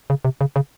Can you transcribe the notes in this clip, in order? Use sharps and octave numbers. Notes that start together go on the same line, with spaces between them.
C#3
C3
C#3
C#3